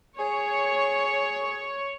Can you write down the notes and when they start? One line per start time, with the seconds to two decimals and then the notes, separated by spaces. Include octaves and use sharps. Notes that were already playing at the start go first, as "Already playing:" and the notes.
0.19 G#4 C#5